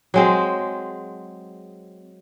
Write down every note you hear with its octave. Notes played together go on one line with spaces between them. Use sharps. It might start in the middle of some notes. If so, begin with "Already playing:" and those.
F#3 G#3 C4